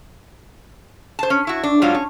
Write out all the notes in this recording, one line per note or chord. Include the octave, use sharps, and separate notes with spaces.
C5 A5
C#4
E4 F#4
D4
G#2 F#3 D4 F4
C#4